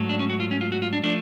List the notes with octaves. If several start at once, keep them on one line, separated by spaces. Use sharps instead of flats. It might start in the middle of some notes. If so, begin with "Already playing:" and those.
Already playing: G#2 F#3 A3
D4
C#4
F#4
F4
C#4
F4
F#4
F4
D4
F3 A3 D4